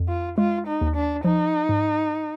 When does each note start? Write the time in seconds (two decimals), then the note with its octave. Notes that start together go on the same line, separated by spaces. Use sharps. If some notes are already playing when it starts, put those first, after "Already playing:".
Already playing: F2
0.08 F4
0.38 G#3 F4
0.67 D#4
0.81 D#2
0.95 D4
1.24 F3 D#4
1.69 G#2